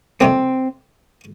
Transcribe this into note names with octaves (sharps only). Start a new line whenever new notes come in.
F2 C3 G3 A#3 C4